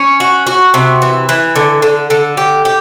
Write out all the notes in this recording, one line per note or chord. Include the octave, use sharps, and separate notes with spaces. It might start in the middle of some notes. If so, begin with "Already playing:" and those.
Already playing: C#4
F#4
F#4
C3
E3
E3
D3
D3
D3
G4
G4